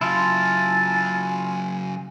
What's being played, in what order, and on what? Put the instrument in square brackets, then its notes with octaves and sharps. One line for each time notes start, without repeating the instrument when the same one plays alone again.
[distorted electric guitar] C#3 F#3 [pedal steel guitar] E4 F4 [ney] G#5 [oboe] A5